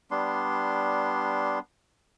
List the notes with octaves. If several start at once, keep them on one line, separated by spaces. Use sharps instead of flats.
G3 B3 D4 C6